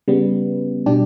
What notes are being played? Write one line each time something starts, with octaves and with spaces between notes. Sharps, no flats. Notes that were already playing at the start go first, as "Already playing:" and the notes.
C#3 G3 B3
B2 G3 D4 G4